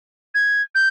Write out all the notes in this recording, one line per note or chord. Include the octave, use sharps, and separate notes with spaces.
G#6
G6